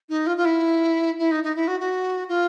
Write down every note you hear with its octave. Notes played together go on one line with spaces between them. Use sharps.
D#4
F4
F4
E4
E4
D#4
D#4
E4
F#4
F#4
F4